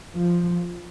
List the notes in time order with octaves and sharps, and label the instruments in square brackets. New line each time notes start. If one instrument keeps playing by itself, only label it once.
[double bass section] F3